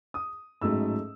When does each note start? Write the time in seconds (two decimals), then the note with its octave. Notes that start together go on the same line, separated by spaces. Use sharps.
0.14 D#6
0.62 A1 G#2 F#3 A3 E6